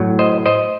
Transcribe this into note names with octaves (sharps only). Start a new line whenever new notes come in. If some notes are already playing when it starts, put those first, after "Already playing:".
Already playing: A2 F#3
C5 D#5
C5 D#5